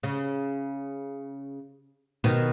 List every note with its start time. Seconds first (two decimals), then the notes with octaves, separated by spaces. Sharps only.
0.03 C#3
2.24 B2 D#3